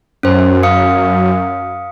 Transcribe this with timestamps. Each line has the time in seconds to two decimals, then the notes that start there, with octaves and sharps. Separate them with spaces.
0.23 F#2 C#4 C5
0.63 F5 D#6 C#7